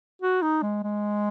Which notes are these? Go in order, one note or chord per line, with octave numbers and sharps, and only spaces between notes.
F#4
D#4
G#3
G#3